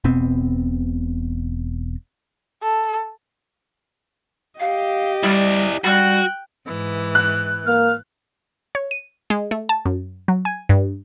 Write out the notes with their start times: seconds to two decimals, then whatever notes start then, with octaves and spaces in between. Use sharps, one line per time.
0.04 E1 B2 B3 C4
2.63 A4
4.60 G4 D#5 F5
5.23 G3 E4 D5
5.84 G3 F#4 G5 F#6
6.66 G#2 E3
7.15 F#6
7.66 A#3 F6
8.75 C#5
8.91 D#7
9.30 G#3
9.51 A3
9.69 A5
9.86 F#2
10.28 F#3
10.45 G#5
10.69 G2